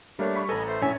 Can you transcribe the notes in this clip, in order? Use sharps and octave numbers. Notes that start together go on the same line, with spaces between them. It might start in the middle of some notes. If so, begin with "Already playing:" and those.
G3 A3 A#3 D4 C#5
B5 C#6 B6
A1 A4 B4 D#5 G#5 A#5
A3 C5
A#1 F#2 A2 C#5 E5 G#5